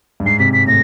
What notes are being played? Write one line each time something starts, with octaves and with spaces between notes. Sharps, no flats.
G2
G#2 C7
C3 B6
B6
A2 A#6